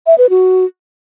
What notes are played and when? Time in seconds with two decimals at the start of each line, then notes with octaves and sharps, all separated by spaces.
0.07 E5
0.18 B4
0.30 F#4